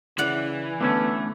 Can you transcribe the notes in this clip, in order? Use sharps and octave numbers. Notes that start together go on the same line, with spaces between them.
C#3 E3 D5 F#5
D3 E3 A3 B3 C#4 A5